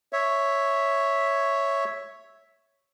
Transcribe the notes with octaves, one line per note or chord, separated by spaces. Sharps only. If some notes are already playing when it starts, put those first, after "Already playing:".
C#5 E5